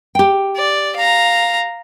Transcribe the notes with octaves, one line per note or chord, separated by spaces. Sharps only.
G4 G5
D5
F5 A#5